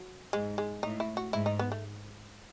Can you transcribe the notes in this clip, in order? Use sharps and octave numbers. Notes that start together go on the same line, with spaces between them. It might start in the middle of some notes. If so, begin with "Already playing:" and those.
Already playing: F#3
G#2 G#3
G#3
A2 D#4
E4
F#4
G#2 E4
D#4
B3
A3